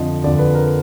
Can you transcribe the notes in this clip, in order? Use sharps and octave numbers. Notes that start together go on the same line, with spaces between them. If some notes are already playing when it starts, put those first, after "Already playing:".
Already playing: F2 D3 F3 D#5
F2 D3 F3 D5
B4
A#4